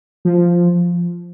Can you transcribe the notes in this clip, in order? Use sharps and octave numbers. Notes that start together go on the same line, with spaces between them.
F3